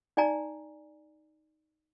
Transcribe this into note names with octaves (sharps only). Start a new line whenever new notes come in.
D#4 D5 G#5 A#5